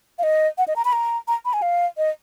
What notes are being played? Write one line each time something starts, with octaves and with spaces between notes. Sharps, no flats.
F5
D#5
F#5
D#5
A#5
B5
A#5
A#5
B5
G#5
F5
D#5